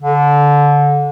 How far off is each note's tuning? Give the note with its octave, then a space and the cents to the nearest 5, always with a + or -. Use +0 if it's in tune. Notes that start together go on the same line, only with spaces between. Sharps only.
D3 -20